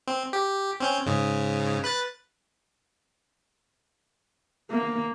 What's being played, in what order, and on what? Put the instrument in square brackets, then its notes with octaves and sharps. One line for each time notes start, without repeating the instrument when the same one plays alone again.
[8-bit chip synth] C4
G4
C4 C#4 G6
G#2 C#3
B4 F#6 A6
[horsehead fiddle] A#3